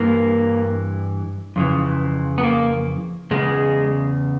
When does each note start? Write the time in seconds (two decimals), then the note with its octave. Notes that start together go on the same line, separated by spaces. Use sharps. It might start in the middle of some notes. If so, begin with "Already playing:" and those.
Already playing: G2 E3 A#3
1.56 F2 C#3 E3
2.38 B3
2.43 A#3
3.31 E2 C#3 G#3